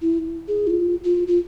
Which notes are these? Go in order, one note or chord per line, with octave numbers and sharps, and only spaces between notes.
E4
G#4
E4
F4
F4
F4